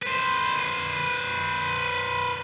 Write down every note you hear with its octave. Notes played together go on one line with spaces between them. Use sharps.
B4 C5